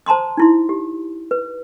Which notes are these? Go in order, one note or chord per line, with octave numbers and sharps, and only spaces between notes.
C5 A5 A#5 C6 D#6
D#4 E4 C6
G4
B4